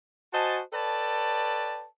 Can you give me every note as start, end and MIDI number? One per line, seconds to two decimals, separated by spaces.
0.33 0.60 66
0.33 0.60 72
0.33 0.60 75
0.33 0.60 80
0.33 0.60 81
0.73 1.85 69
0.73 1.85 71
0.73 1.85 73
0.73 1.85 74
0.73 1.85 79
0.73 1.85 81